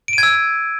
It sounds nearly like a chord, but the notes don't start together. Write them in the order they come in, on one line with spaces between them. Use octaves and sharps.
D7 D#7 G#6 E6